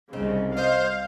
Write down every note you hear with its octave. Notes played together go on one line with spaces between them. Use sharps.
C2 C#3 C4 D#4
C5 D#5 F5